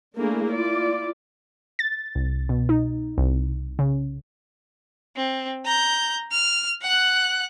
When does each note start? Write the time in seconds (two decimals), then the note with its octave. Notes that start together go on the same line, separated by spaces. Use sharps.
0.16 A3 A#3 D4 E4 G#4
0.51 E4 F4 D5
1.79 A6
2.15 C2
2.49 B2
2.69 D#4
3.18 C2
3.79 C#3
5.17 C4
5.65 A#5 G6
6.32 F6
6.82 F#5 F#6